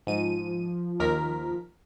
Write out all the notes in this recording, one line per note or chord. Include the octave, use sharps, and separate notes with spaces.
G#2 F3 D#7
D#2 A#4 B6